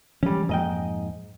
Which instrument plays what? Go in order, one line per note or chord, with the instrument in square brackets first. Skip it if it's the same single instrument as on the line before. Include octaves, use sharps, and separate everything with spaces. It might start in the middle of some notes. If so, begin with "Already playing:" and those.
[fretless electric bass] E3 F3 G#3 [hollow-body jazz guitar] G3 C#4
[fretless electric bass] F2 F3 A#3 [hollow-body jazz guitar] G#2 D#5 G5